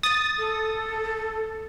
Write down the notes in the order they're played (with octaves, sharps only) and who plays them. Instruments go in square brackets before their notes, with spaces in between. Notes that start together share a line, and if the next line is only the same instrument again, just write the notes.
[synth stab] D#6 A6
[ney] A4